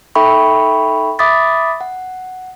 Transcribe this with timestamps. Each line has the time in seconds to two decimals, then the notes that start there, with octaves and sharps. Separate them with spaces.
0.15 D#4 A4 E5 G5 B5 C#6
1.19 E5 B5 D6 D#6 A6 B6
1.81 F#5